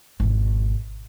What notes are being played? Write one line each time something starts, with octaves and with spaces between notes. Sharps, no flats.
G#1 B2